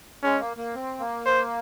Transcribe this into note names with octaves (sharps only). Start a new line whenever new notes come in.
G#3 C#4
A#3
A#3
C4
A#3
C5